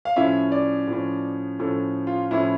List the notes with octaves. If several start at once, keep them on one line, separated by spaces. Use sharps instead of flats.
F5
A2 F3 C#4 E5
D5
A2 F3 C#4
A2 F3 C#4 A4
F4
A2 F3 C#4 E4